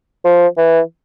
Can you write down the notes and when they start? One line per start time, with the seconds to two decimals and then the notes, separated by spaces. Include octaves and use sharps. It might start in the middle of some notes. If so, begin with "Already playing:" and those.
0.25 F3
0.57 E3